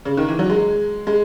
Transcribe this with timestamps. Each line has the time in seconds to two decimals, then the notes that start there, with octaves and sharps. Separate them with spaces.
0.05 C#3
0.17 D#3
0.28 E3
0.39 F#3
0.50 G#3
1.07 G#3